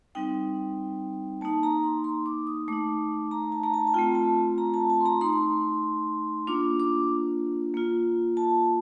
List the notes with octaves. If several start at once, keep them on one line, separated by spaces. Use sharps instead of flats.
G3 C4 D#4 G5
A#3 D#4 A5
A#5
C6
C6
D6
D#6
A3 D#4 D6
A#5
A5
A#5
A5
A5
A3 C4 F4 G5
A5
A#5
A5
A5
C6
A#5
A3 D#4 C6
A#3 D4 F4 D6
D6
A#3 F4
A5